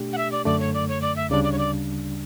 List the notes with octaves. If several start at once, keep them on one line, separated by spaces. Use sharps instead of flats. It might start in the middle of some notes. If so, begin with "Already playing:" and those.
Already playing: B2 A3 D4 G4
F#5
E5
D5
F#2 D3 A3 D5
C#5
D5
C#5
D5
E5
D2 C#3 G3 D4 D5
D5
C#5
D5